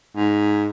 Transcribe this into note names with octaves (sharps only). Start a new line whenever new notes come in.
G#2